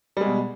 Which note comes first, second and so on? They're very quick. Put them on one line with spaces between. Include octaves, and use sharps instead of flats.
G3 G#3 B2